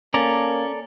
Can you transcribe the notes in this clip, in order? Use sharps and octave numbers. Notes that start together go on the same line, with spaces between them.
A#3 C#4 A4 D5 A#5